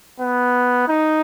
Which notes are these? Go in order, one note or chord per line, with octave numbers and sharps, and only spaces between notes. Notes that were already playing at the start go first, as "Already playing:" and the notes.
B3
D#4